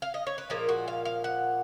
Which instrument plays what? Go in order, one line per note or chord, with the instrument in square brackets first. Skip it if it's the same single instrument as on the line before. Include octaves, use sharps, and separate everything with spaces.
[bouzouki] F5
D#5
C#5
B4
A#2 F3 G#3 A#4
F#4
F5
F5
F#5